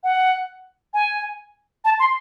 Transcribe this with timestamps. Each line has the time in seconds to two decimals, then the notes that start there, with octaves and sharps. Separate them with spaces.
0.04 F#5
0.94 G#5
1.85 A5
2.00 C6